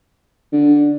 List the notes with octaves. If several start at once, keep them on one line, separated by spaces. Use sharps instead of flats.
D3